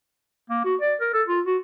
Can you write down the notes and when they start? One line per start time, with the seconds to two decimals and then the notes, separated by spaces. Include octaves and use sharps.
0.50 A#3
0.64 F#4
0.81 D5
1.01 A#4
1.14 A4
1.28 F4
1.46 F#4